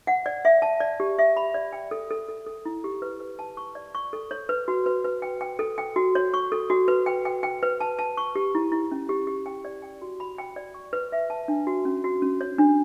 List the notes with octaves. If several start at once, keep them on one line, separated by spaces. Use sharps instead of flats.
F#5
D5
E5
A5
D5
G4
E5
B5
D5
G5
A4
A4
A4
A4
E4
G4
B4
B4
A5
C#6
D5
C#6
A4
C#5
B4
F#4
B4
B4
G5
G5
A4
G5
F#4
C#5
C#6
A4
F#4
B4
G5
G5
G5
B4
A5
A5
C#6
G4
E4
E4
C#4
G4
G4
G5
D5
G5
F#4
B5
G5
D5
C#6
B4
E5
A5
D4
F#4
C#4
F#4
C#4
C#5
D4